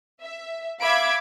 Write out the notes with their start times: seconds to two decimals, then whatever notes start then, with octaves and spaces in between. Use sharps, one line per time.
0.21 E5
0.81 E5 F5 B5 D6 G#6 D7